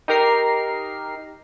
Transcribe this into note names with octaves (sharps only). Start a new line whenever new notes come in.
D#4 G4 A#4 A#5 C7